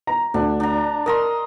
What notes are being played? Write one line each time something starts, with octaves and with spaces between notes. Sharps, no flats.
A#5
D2 D4
D4 A#5
A#4 D#5 A#5 C6